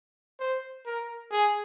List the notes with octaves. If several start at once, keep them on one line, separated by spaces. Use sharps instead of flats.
C5
A#4
G#4